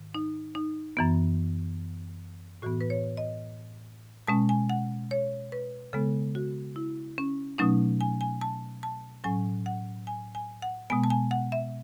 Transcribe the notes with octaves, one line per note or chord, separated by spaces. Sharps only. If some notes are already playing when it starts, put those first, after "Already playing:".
Already playing: G#2 D#3
D#4
D#4
F#2 E3 B3
A2 E3 B3 F#4
B4
C#5
D#5
B2 G#3 C#4 A5
G#5
F#5
C#5
B4
C#3 G#3 B3 A4
F#4
E4
C#4
B2 F#3 A3 C#4 D#4
G#5
G#5
A5
A5
A2 F#3 C#4 G#5
F#5
G#5
G#5
F#5
B2 G#3 B3 G#5
A5
G#5
F#5
E5